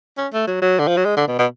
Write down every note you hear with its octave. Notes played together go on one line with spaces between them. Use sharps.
C#4
A3
F#3
F#3
D3
F3
F#3
G#3
D3
B2
B2